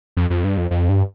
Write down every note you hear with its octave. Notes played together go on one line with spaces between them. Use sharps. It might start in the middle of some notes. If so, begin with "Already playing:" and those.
F2
F2
G2
F2
F2
G2